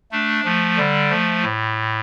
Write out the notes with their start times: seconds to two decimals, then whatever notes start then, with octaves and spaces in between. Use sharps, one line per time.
0.12 A3 D4
0.44 F3 A3
0.77 D3 G3
1.10 F3 A3
1.43 A2